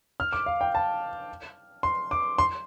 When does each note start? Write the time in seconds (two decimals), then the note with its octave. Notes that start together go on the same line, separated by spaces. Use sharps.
0.20 F6
0.33 D6
0.46 F5
0.61 G5
0.75 A5
1.83 C6
2.11 D6
2.38 C6